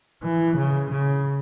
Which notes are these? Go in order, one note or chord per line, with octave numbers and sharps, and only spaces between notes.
E3
C#3
C#3